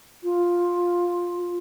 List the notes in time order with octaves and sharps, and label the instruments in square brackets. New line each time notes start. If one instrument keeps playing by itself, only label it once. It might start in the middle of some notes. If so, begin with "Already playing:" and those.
[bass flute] F4